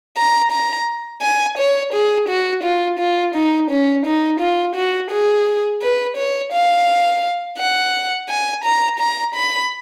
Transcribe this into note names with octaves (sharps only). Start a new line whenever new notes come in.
A#5
A#5
G#5
C#5
G#4
F#4
F4
F4
D#4
C#4
D#4
F4
F#4
G#4
B4
C#5
F5
F#5
G#5
A#5
A#5
B5